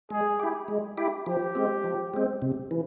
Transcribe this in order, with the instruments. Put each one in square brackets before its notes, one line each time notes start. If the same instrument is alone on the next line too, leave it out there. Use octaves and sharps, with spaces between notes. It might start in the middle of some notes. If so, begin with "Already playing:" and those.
[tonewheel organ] G#3 [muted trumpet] G#4
[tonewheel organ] E4 G4
G#3
E4 G4
[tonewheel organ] F3 [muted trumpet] G4
[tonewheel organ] G#3 C4
F3
G#3 C4
C3
E3